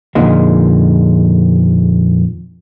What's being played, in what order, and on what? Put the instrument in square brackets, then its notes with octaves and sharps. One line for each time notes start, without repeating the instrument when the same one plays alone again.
[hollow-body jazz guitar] F2 A#2 D3 D#3 G#3